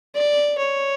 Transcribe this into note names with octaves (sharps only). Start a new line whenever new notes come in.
D5
C#5